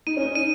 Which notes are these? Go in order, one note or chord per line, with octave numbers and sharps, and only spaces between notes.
D#4 D#7
C#4
D#4
D#7